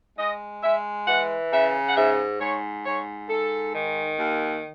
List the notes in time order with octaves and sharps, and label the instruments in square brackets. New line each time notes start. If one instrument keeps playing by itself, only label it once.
[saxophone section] G#3 D#5
G#3 E5
E3 F#5
C#3 E5
F#5
G#2 E5
G#2 C#5
G#2 C#5
G#2 A4
D#3
D#2